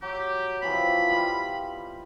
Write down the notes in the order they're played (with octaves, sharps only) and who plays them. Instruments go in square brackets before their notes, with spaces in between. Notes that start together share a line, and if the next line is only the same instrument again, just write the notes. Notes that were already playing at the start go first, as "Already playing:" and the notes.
[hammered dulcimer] F#3 [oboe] G4
[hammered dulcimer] C3 E3 F3 [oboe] B5
[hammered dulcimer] G3 B3 F4